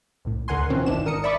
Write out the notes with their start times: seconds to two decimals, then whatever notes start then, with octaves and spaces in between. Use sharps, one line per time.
0.25 C2 A2
0.48 D2 D3 A#4 F#5 G#5 C6
0.70 B2 E3 F3 C4 C#4
0.86 G1 D#3 E3 D4 E7
1.05 G#1 A#4 D#6 C#7
1.24 D5 E5 B5 C#6 D6